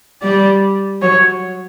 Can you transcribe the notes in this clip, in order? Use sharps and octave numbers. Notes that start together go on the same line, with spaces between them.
G3 D5
F#3 C#5